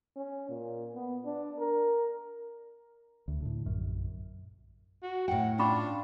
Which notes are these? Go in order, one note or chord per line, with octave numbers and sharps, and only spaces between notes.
C#4
A#2
B3
D4
A#4
D2
A2 D3
A#1 F#2
F#4
A2 F#5 G5
C#4 D4 F4 B5 C#6